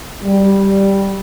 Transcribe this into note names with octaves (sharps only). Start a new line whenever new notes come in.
G3